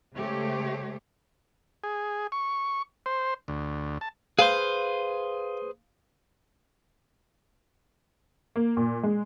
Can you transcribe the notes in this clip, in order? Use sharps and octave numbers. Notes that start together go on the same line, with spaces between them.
C#3 G#3 A3 G4 C5 C#5
G#4
C#6
C5
D2
A5
G#4 B4 C5 F5
A#3
A#2
G#3